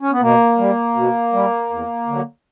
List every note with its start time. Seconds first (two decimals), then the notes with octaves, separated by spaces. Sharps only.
0.01 C#4
0.11 B3
0.21 B2 A#3
0.58 G3
0.95 B2
1.33 G3
1.70 E2
2.07 D3 F#3